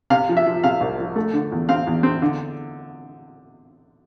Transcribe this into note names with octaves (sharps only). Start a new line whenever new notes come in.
C3 F5
F3
E5
F3
C3 F5
C2
F3
A3
D3
E2
C4 F5
E2
C4
D3